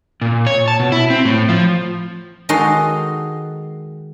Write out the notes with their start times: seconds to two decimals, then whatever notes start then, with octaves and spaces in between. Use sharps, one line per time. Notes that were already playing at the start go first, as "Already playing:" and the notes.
0.21 A#2
0.47 C#5
0.68 A5
0.80 B2
0.92 E4
1.10 C4
1.25 A2
1.49 F3
2.49 D#3 G#3 D#4 F#4 A4 C6